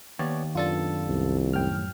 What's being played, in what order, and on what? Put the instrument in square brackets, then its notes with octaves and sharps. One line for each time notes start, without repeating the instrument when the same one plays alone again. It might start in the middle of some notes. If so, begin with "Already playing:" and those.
[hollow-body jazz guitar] D#2 [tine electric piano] B3 C#5 D5
[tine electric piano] F#2 A4 A6 [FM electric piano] B3 D4 F4
[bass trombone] C2
[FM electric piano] F#2 G5 F6 [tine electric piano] A2